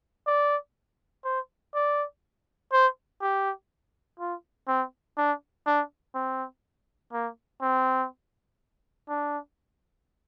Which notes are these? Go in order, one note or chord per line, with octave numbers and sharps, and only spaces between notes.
D5
C5
D5
C5
G4
F4
C4
D4
D4
C4
A#3
C4
D4